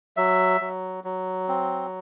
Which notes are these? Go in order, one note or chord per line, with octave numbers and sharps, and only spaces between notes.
F#3 E5
F#3
F#3
C4